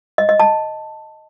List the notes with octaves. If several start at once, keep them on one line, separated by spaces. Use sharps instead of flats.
D#5
D#5
A5